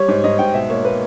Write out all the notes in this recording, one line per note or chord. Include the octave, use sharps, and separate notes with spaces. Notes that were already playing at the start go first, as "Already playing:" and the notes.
Already playing: G3 C#5
G#2
G#2 D#5
G#2 G5
B2 E5
A#3 C#5
A#3 B4